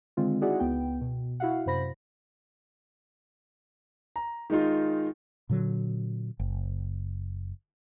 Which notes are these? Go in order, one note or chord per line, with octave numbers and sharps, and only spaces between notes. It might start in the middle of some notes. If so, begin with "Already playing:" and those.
D3 D#3 G#3 C4 F4
D#4 E4 F#4 G#4 D5 F#5
C#2 B3 G5
B2
E4 F#4 F5 F#5
F#2 C3 C5 B5 A#6
A#5
D#3 G#3 D#4 F4
A#2 D3 F#3
F#1